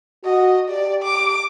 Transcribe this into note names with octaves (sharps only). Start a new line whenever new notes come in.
F#4 D#5
G4 D5
D6